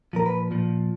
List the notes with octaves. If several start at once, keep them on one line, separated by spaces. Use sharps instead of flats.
A#2 F3 A#4
B4
A#2 F3